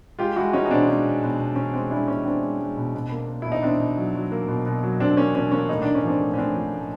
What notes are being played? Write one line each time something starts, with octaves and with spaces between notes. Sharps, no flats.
G#3 F4 G4
G#3 E4 F#4
G#3 C#4 D#4
D#4
B2 C4 D4
G#3 C#4
B2
B2
B2
B2 C#4
G#3 C4
G#3 D4 E4
B2 C#4
G#3 C4 D4
G#3
G#3
B2
B2
A#3
A#3
B2 E4
D#4
B2 C4 D4
B2
F#3
F#3
A#3
B2
B2
F#3
B2 C4 D4
A#3 C#4
B2 C#4
A#3 C#4
A2 D#4
A2 D4
C#4
F3 C4 D4
A2
C#4
A2 C4 D4
F3
A2